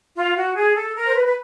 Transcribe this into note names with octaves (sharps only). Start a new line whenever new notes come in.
F4
F#4
G#4
A4
A#4
C5
B4
B4